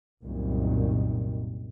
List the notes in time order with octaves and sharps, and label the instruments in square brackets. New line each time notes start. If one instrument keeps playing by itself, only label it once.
[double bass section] C2 F#2 A#2 D#3